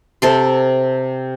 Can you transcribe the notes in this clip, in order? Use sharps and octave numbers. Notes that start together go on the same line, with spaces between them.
C3 A4 C6